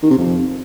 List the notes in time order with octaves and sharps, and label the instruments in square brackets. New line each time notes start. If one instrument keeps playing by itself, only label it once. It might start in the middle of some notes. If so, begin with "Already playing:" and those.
[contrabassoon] D#3
C3
F2